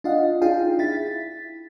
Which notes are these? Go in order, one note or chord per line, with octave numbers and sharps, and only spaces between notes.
D4 F4 D#5 F5 F#5
D4 D#4 F4 G#4 F5 G5
E4 A6 B6